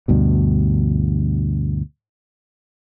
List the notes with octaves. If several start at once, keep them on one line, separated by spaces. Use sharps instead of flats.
D2 G2 B2